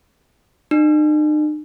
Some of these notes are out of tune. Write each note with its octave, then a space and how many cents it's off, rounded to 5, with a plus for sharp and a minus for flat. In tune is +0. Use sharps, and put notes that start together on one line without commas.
D#4 -45